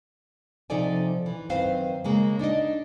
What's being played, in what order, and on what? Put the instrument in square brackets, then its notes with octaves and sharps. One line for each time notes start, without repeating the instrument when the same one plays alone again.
[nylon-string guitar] C3 F3 D#4 A4 D5 G#5
E3
F#2 D#3 C4 B4 C5 F5
C#3 G#3 A#3
D4 D#4 D5 D#5